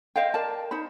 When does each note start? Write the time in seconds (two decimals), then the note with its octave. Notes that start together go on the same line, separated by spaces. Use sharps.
0.16 C5 D#5 F5 G5
0.34 A#4 D5 A5
0.71 D#4 C5 B5